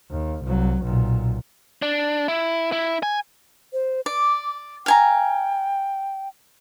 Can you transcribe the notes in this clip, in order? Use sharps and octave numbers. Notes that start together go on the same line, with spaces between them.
D#2
C2 F#3
B1 A#2
D4
E4
E4
G#5
C5
D5 D6
F5 G5 G#5 A#5